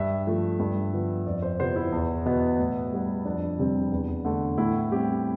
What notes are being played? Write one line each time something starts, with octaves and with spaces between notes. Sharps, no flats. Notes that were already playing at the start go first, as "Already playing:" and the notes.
Already playing: G2 E5
F3 A3
G2
F3 B3
F2 D5
C5
C3 F3 B3 C5
E4
E2
B2 B3
A2
G3 B3
F2 D4
C3 G3 C4
E2
D3 A3
A2 E4
G3 C4 G4